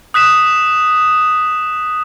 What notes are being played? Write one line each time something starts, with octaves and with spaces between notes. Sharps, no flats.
D#6 F#6 B6 E7